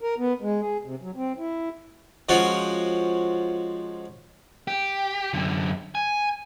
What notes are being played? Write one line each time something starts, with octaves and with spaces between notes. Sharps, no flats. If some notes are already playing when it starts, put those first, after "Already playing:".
A#4
B3
G#3
G#4
C3
F#3
C4
E4
F3 G#3 C#4 F4 F#4
G4
F#2 D3
G#5